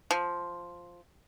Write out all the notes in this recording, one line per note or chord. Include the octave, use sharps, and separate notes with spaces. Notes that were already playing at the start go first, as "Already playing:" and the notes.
F3